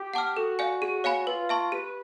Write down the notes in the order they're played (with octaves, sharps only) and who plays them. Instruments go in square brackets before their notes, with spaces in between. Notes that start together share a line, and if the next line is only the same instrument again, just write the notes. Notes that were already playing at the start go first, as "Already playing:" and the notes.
Already playing: [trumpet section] G4
[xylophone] F#5 A5 D6 F6
[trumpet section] F#4 [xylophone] A4
[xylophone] D5 F5 G#5
G#4
C#5 F5 G#5 B5
[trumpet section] F4 [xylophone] B4
[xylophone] E5 A5 C#6
[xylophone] G4 [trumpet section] B4